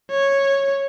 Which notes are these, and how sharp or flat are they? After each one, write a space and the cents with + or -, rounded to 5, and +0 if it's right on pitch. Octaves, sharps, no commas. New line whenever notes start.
C#5 -10